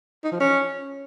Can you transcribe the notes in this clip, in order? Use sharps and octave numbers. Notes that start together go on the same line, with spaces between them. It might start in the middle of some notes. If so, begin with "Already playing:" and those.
D#4
F3
C#4